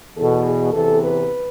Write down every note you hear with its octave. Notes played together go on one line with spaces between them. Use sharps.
E2 B2 A4
G#4
E2 C3 E3 A4
B4